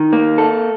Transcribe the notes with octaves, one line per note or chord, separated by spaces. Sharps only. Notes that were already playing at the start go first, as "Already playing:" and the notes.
Already playing: D#3
A#3
A4